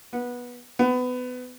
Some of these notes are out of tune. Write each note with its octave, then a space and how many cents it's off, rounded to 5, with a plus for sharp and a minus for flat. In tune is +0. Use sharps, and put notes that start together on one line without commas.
B3 -15
B3 +25